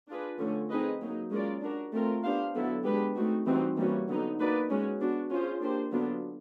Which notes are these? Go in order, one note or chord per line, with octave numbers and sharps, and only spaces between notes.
D4 F4 G#4 B4
D3 F3 A3 C#4
C4 D#4 G#4 B4 D#5
F#3 A#3 D#4
G#3 C#4 F4 A#4 D5
D4 F#4 A#4
A3 C4 F4 A#4
B3 D4 G4 C5 F5
D3 F#3 B3 E4 A4
G#3 B3 D4 G4 B4
A3 C4 D#4 F#4
E3 G3 C4 D#4 F#4
E3 G3 A#3 C#4 F#4
D3 F#3 B3 D#4
A#3 D#4 F#4 B4 D5
G#3 C#4 F#4
B3 D4 F#4
C#4 F4 G#4 C5
A#3 D4 G4 C5
D3 F#3 B3 D4 F4